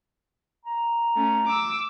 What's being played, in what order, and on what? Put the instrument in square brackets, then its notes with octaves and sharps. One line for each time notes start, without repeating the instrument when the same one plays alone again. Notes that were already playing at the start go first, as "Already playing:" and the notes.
[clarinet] A#5
[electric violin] A3 C#4
D6 E6